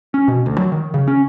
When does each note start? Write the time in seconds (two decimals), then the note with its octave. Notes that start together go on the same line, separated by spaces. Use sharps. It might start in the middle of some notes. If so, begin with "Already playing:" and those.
0.14 C#4
0.28 B2
0.46 D2
0.58 F#3
0.72 D#3
0.94 C#3
1.08 C#4